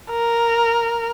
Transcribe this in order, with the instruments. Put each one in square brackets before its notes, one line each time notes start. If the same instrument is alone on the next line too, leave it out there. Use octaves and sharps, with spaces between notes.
[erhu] A#4